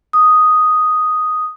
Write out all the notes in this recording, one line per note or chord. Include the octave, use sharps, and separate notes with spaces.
D#6